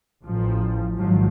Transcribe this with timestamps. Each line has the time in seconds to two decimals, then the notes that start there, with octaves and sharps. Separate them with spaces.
0.23 A1 F3
0.97 G#1 F3 F#3